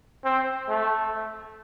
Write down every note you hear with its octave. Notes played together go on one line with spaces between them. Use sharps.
C4
A3